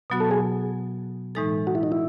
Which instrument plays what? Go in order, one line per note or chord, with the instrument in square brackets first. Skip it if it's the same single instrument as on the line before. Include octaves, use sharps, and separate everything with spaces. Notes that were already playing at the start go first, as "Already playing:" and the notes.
[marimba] B2 F#3 B3 F#4
[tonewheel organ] A4
G#4
[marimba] A2 E3 G#3 D#4 A4
[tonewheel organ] F#4
E4
D#4
E4